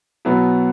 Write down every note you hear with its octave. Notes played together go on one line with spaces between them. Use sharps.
B2 F#3 B3 E4